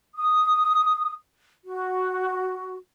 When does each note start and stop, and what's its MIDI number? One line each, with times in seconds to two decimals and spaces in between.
0.16 1.13 87
1.66 2.77 66